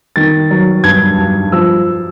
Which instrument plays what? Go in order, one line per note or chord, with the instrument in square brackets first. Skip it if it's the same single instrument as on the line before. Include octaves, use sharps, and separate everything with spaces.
[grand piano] D#3 A6
F#3
G2 G#6
G2
F3 E6